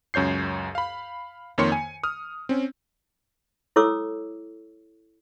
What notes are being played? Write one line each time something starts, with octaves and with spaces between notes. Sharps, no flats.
C#2 F#2 C#5 G6 C7
F5 B5
F2 D#3 A#3 C#5 C6 C#7
G#5
D#6 F6
C4 C#4
E4 A4 C#5 D6 E6